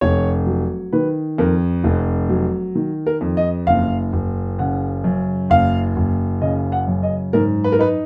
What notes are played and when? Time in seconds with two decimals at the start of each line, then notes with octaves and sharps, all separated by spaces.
0.01 F1 C#5
0.47 F#3
0.93 D#3 B4
1.38 F2 A#4
1.84 F1
2.29 F#3
2.75 D#3
3.06 A#4
3.21 F2
3.37 D#5
3.67 F#1 F5
4.13 F#1
4.59 C#3 F#5
5.04 F#2
5.50 F#1 F5
5.96 F#1
6.41 C#3 D#5
6.72 F#5
6.87 F#2
7.03 D#5
7.33 G#2 A#4
7.64 B4
7.72 A#4
7.79 D#4 B4